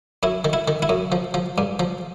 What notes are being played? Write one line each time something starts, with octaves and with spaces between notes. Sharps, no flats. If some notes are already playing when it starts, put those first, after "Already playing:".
F#2 E4
D#3
E4
D#3
E4
F#2
F3
F3
G2
F3